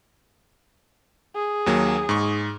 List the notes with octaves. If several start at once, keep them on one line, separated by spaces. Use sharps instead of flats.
G#4
D#2 F#3 A#3
G#2 C#6